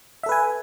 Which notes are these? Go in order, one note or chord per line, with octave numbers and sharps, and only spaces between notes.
A4 B4 E5 G#5